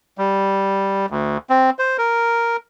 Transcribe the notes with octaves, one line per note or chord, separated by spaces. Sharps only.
G3
D2
C4
C5
A#4